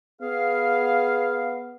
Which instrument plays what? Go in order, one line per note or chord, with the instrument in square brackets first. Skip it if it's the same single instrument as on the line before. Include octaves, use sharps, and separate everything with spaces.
[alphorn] B3 [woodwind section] G#4 F5